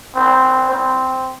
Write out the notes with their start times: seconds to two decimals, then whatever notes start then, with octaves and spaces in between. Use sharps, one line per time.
0.15 C4
0.70 C4